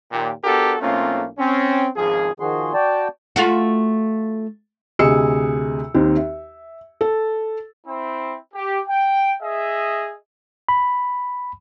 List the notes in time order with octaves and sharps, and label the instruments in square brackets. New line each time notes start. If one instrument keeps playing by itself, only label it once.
[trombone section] D#2 A#2 G4
B3 D4 F#4 G4 A4 A#4
B1 A3 A#3 C4 C#4 F4
C4 C#4
G#1 C#2 F3 G#4
[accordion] D#3 F3 F#4 G#4 C6
F#4 D5 G5 A5
[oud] A3 F4 F#4
[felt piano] D2 C3 G#4 D#5 E6 C#7
D#2 D#3 C4
E5
A4
[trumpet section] C4 E4
G4
G5
G#4 D#5 E5
[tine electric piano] B5